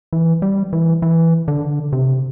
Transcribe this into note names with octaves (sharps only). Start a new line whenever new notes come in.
E3
G3
E3
E3
D3
C3